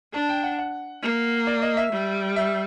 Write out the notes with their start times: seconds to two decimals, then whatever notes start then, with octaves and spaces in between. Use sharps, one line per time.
0.13 D4 A5
0.29 G5
0.43 F#5
0.58 F#5
1.03 A#3
1.47 D5
1.62 D#5
1.77 E5
1.92 G3
2.36 E5